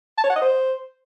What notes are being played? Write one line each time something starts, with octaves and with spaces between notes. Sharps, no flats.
A5
C#5
F#5
D#5
C5